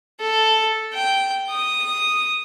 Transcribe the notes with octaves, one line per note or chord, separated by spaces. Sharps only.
A4
G5
D#6